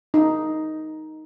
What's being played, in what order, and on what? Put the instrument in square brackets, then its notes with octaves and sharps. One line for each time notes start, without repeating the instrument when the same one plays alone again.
[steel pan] D#4